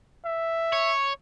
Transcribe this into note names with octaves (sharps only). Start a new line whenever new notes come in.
E5
C#5